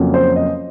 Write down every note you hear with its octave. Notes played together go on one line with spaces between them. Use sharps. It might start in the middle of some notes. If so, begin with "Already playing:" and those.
Already playing: F2 C#3 F#3 A#3 C#4
C5
D#5